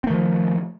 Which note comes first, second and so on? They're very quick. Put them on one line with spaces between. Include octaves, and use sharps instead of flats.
C4 A3 D#3 F3